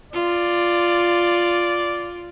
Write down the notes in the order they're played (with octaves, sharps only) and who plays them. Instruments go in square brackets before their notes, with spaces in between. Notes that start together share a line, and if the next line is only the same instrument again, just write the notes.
[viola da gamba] F4 [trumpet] D5